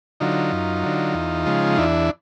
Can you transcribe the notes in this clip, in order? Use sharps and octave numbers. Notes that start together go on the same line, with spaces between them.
D3 F#3 D#4 F4
F#2
D3 F#3
E2
C#3 F3 G#3
E2 D4 E4